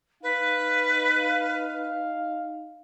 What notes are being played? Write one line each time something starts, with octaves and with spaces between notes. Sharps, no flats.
D#4 B4 F5